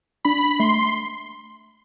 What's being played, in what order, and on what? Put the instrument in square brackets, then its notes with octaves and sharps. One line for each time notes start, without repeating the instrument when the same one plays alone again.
[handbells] D4 [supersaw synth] B5
[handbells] A3 [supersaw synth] C6